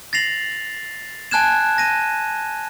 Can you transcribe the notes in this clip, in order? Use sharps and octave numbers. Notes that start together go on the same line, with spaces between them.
A6 A#6 C7 F7 F#7
G#5 A5 F#6 G#6 E7
A#6 D#7